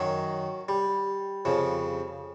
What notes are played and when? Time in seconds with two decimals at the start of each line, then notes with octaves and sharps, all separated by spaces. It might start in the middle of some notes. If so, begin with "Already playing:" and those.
Already playing: F#2 D#3 F#3
0.69 G3
1.45 F2 C#3 F3